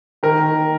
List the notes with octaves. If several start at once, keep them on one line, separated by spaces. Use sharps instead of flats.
D#3 A#4
D#3